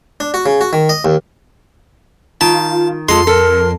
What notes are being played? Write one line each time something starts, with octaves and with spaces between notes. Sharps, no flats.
D4
F#4
C#3
F#4
D#3
D#5
D#2
D#3 F4 A5
F2 G#3 F4 A4 C6
F2 A4 A#4